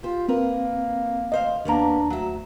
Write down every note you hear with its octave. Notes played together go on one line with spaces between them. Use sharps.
F4 G4 C5
A#3 C4 A#4 B4
D2 C5 D#5 F5
D#2 A#3 B3 C#4 D4 A#5
D2 F#3 E5